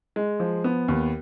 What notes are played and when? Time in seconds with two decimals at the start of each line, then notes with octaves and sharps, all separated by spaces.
0.16 G#3
0.40 F3
0.64 B3
0.88 D#2